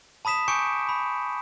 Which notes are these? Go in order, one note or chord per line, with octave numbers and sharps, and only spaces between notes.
A5 B5 D#6 B6 E7
G#5 C#6 D6 G6 C#7 D7
B5